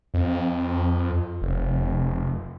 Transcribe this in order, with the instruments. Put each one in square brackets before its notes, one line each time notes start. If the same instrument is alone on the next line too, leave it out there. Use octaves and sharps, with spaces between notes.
[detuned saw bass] F2
F1